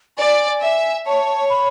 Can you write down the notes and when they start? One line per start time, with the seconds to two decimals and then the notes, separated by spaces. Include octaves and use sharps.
0.17 D5 G#5
0.61 E5
1.06 C#5 A5
1.50 B5